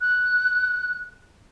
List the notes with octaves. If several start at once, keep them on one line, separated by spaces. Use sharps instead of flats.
F#6